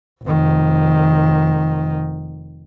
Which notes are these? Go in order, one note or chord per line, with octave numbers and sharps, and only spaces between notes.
F1 D#3